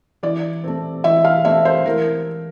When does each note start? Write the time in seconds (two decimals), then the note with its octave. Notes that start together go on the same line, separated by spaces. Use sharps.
0.23 E3 D5
0.64 A3 C4
1.04 E3 E5
1.25 F5
1.45 A3 C4 E5
1.65 C5
1.85 E3 A#4